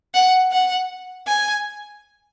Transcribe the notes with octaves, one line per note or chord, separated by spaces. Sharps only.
F#5
F#5
G#5